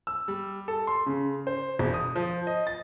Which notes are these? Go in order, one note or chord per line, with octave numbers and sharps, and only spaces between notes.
E6
G3
A4
C6
C#3
C5
E1
D#6
F3
D#5
A6